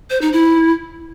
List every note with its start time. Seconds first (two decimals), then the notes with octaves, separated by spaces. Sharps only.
0.10 C5
0.21 D#4
0.33 E4